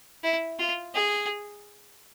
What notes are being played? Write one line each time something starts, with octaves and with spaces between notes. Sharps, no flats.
E4
F4
G#4